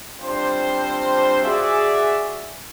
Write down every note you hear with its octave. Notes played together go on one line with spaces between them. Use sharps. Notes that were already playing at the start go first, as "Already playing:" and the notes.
G3 C4 D4 F4 C5
F#4 G#4 D5 E5